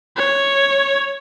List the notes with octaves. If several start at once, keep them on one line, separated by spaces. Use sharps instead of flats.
C#5